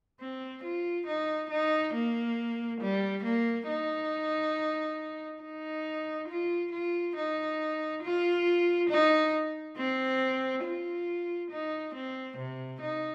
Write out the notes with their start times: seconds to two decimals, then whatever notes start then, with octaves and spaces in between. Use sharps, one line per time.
0.20 C4
0.63 F4
1.07 D#4
1.50 D#4
1.94 A#3
2.81 G3
3.24 A#3
3.68 D#4
5.42 D#4
6.29 F4
6.72 F4
7.16 D#4
8.03 F4
8.90 D#4
9.77 C4
10.64 F4
11.51 D#4
11.95 C4
12.38 C3
12.81 D#4